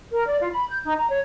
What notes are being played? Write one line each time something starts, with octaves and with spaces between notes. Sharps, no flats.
A#4
D5
F4
B5
G6
D#4
A#5
C#5